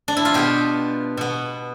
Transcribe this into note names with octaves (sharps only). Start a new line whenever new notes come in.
D4
E4
F4
B2 B3 G4
B2 B3